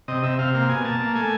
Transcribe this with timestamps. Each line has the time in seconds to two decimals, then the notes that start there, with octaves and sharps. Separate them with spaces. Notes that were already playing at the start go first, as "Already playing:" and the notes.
0.08 C3 D#5
0.23 C3 E5
0.38 C3 F5
0.54 A#3 F5
0.69 B2 G#5
0.85 A#3 A5
1.00 A#3
1.15 A3 G#5